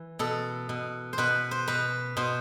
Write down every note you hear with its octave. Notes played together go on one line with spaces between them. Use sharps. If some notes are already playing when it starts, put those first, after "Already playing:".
Already playing: E3
B2 A4
B2
C5
B2 B4
C5
B2 B4
B2 C5